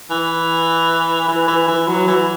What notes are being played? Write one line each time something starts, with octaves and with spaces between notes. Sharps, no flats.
E3
E3
E3
E3
F#3
E3